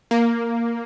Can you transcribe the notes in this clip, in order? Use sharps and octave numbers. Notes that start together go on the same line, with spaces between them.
A#3